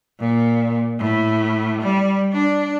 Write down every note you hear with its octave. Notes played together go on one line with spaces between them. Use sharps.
A#2
A2
G3
D4